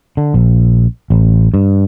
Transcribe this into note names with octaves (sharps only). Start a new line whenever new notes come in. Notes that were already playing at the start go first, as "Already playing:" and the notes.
D3
A#1
A1
G2